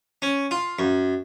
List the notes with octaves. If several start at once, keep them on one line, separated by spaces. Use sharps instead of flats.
C#4
F4
F#2